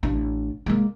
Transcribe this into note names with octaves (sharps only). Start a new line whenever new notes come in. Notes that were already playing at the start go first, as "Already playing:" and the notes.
A1 D4
G#3 A#3